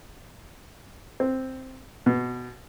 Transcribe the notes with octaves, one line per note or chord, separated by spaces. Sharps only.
C4
B2